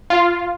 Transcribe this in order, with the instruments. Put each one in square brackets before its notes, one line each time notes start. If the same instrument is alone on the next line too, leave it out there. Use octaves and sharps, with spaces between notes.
[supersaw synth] F4